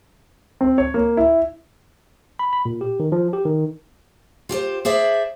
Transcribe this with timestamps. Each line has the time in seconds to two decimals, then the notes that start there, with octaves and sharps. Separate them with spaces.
0.61 C4
0.78 C#5
0.94 A#3
1.17 E4
2.39 B5
2.53 B5
2.65 A#2
2.81 G4
3.00 D#3
3.12 F3
3.33 G4
3.45 D#3
4.49 F4 G4 A4 C5
4.85 G#4 C5 D5 E5